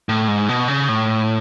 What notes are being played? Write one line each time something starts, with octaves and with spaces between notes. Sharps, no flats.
A2
G#2
B2
C#3
A2